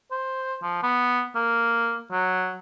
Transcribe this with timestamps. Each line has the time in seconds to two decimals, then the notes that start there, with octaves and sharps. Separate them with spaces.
0.11 C5
0.62 F3
0.83 B3
1.35 A#3
2.11 F#3